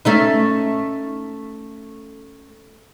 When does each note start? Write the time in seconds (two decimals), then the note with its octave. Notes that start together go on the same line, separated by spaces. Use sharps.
0.05 A3 C#4 D#4